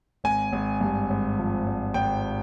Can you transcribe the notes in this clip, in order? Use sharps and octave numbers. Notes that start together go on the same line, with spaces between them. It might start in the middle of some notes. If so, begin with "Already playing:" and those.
G#1 G#5
G#1
G2
G#1
F3
G#1
G#1 G5